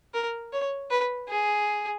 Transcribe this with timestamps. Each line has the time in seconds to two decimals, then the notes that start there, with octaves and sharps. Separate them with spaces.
0.14 A#4
0.52 C#5
0.91 B4
1.29 G#4